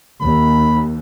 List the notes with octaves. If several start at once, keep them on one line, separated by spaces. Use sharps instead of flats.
D#2 B5